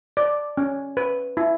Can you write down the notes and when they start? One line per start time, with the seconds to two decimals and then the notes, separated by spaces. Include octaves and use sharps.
0.17 D5
0.57 C#4
0.97 B4
1.37 E4